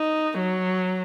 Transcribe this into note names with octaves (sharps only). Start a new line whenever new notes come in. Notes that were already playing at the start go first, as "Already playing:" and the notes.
Already playing: D#4
F#3